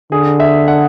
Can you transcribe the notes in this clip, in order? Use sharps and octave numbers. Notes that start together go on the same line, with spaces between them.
D3 G#4
E5
F#5